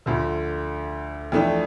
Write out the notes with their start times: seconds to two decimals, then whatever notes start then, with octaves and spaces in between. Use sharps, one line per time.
0.06 D2 D3 F3
1.32 F2 E3 A3 D4